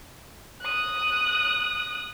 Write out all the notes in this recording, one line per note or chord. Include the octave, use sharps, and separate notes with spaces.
D#6 F#6